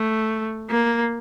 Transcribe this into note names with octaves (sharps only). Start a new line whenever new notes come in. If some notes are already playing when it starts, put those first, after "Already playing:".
Already playing: A3
A#3